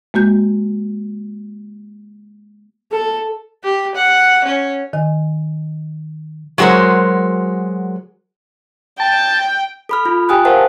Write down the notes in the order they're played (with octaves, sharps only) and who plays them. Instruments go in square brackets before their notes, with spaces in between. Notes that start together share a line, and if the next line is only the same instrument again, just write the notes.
[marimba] G#3 A#3 F#4 G6
[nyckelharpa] A4
[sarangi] G4
F#5
C#4
[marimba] D#3 D#5 G#5
[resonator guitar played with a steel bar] F#3 G#3 F#4 A#4 C5
[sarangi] G5 [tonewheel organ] A5
[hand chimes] A4 B5 F6
F4
G4 G5 G#5 D#6 F#6
A#4 C5 F5 F#5 A5